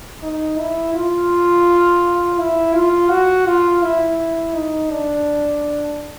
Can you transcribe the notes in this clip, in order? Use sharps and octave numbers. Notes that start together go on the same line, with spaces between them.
D#4
E4
F4
E4
F4
F#4
F4
E4
D#4
D4